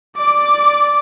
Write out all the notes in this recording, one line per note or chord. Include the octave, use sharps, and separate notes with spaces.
D5 D6